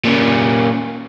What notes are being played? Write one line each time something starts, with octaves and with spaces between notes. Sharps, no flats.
A#2 C#4